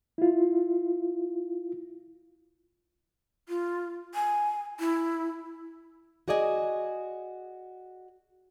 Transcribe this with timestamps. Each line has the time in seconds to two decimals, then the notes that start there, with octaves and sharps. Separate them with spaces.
0.18 E4 F4
3.49 F4
4.14 G#5
4.80 E4
6.28 F#4 G#4 D5 D#5 G#5